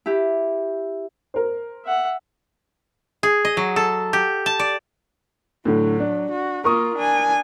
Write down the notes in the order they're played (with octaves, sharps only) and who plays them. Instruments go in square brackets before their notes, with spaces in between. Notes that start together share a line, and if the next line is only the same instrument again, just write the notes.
[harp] E4 G4
[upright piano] A#4 C5
[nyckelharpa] E5 F#5
[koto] G#4
D#5
F#3
A4
G4
A5
D5
[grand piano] A2 D3 [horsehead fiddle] F#3
[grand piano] D4
[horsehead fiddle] F#4
[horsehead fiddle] A#3 F4 [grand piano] A#4 C#6 D#6
[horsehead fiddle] D4 G#5